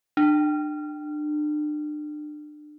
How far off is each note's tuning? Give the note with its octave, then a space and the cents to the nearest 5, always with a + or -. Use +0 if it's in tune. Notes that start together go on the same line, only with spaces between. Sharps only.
D4 +35